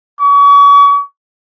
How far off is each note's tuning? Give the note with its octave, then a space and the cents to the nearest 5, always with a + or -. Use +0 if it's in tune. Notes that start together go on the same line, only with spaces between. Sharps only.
C#6 +40